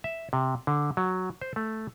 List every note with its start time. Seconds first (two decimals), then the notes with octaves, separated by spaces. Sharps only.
0.04 E5
0.33 C3
0.67 D3
0.97 F#3
1.41 C5
1.56 A3